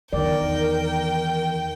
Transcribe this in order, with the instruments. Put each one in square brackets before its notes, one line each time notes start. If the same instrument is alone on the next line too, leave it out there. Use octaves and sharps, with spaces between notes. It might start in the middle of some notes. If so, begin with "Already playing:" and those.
[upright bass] E2 [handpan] D#3 D5 [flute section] A#4 [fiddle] G5